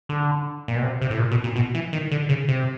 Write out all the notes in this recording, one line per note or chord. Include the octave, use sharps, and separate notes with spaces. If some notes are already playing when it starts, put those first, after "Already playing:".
D3
A#2
B2
C3
C3
A2
A#2
B2
A#2
B2
E3
D#3
D3
C#3
C3